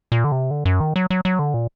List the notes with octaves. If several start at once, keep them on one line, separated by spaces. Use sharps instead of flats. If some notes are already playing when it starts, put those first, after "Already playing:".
A#2
D3
C3
D3
F#2
D#3
F#3
F#3
F#3
D3
A#2